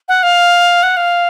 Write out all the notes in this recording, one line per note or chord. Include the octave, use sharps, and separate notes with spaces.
F#5
F5
F#5
F5